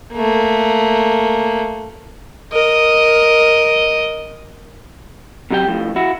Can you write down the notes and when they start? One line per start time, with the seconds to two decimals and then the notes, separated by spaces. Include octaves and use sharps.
0.13 A3 A#3
2.53 A#4 D#5
5.51 C3 F#3 G4 C#5 G5
5.68 A2 F3
5.96 E4 F#4